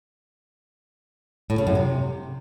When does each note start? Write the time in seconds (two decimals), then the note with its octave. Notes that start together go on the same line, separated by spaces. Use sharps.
1.50 A2
1.58 C#3
1.67 F#2
1.75 C3